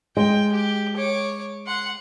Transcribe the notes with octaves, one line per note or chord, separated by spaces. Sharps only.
G#3 G5
G4
C#5 D6
F#5 C6